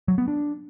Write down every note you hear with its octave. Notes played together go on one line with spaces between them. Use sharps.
F#3
B3
D4